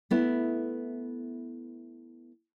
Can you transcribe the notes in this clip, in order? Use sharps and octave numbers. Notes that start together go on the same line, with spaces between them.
A3 B3 E4